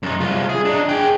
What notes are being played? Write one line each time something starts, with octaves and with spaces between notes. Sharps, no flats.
F#2 D#4
C2 F4
G#4
D4 D#4
G#4 G5